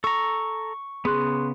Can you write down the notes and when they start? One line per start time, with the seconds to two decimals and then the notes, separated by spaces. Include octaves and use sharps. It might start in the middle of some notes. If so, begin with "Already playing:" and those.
0.04 A4 A#5 C#6
1.05 C#3 B3 G#4 C6 F#6